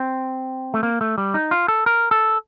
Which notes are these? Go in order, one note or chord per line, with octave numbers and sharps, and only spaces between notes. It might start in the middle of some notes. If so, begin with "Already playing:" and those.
Already playing: C4
A3
A#3
A3
G3
D#4
F4
A4
A#4
A4